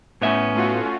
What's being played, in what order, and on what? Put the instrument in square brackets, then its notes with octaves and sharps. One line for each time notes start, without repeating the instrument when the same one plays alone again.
[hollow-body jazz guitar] A2 B3 E5 [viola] C#4
[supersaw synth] A3 F4 F#4